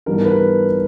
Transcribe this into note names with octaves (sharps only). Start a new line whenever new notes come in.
G#2 E3 G3 B3 D4 A#4
B4